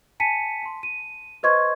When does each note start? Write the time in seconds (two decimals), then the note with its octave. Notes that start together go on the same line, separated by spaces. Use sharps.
0.20 G#5 A5 B6 C#7 D#7
0.63 A5 C6
0.83 D#7
1.43 B4 C5 D#5 C6 C#6 G#6